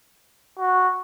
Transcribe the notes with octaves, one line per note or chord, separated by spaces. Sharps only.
F#4